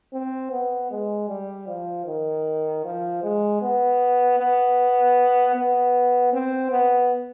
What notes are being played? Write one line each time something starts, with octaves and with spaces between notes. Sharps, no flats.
C4
B3
G#3
G3
F3
D#3
F3
G#3
B3
B3
B3
C4
B3